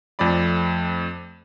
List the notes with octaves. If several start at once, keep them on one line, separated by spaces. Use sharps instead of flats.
F2 A3 C4 D5 B5